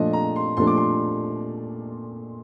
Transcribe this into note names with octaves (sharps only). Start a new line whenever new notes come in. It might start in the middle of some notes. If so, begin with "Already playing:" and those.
Already playing: A#2 F3 A3 D4 D#5
A#5
C6
A#2 F3 A3 D4 C6
D6
C6